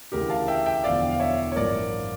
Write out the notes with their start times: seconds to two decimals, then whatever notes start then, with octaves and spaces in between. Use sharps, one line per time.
0.12 D2 C#3 E3 G4 A#4
0.30 F5 A5
0.48 E5 G5
0.66 E5 G5
0.84 E1 E2 D3 F3 D5 F5
1.11 F5
1.20 C#5 E5
1.52 C#5
1.56 A1 G2 F3 A#4 D5